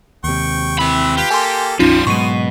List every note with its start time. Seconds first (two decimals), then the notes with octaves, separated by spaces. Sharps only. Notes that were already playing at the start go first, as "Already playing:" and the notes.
0.24 D#2 C3 G5 C#6
0.79 E3 C4 E5 B5
1.17 F4 G4 B4
1.30 A#3 A4 G#5 C6
1.79 A#1 F2 F3 G3 C#4 D#4 F4 C6
2.07 G#2 B2 F#3 G#3 C#6 D#7